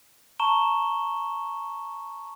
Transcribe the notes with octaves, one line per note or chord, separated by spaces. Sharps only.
A5 A#5 C#6 E7 G7